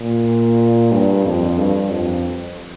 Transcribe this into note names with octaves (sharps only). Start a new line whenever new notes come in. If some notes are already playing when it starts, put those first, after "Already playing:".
Already playing: A#2
G2
F2
G2
F2